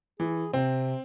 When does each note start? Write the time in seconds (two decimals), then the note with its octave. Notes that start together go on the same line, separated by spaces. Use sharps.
0.20 E3 G#4
0.53 C3 C4